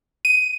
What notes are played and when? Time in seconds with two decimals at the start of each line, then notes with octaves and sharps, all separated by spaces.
0.25 D#7